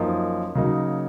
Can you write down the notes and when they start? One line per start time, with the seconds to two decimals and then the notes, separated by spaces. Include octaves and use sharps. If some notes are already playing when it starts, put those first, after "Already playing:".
Already playing: F#2 F3 A#3 D#4
0.55 C#3 F#3 A#3 D#4